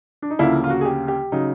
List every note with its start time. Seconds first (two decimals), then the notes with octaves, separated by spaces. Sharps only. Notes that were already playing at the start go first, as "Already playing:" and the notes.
0.22 D4
0.30 D#4
0.39 D2 C#3 F3 A#3 E4
0.64 F4
0.70 F#4
0.81 G#4
0.85 G4
1.08 G4
1.32 C#3 F#3 D#4